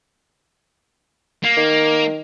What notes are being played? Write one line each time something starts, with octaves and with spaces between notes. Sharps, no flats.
A#3
D#3